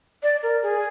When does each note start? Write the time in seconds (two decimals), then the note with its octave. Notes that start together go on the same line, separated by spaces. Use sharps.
0.23 D5
0.43 A#4
0.63 G#4